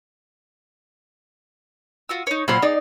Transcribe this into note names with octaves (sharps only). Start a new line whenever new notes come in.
F4 F#4 E6
D#4 C#5
A#2 F#3 C5 B5 C6 F6
D#4 G#4 D5